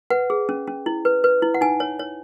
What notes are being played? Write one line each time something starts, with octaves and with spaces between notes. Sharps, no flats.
B4 F#5
G#4
C#4
C#4
E4
B4
B4
E4
F#5
D#4 G#5
C#5
C#5